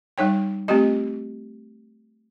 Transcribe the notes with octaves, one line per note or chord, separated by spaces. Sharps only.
G3 D#4 C#5 G5
A3 C4 F4 G4 D#5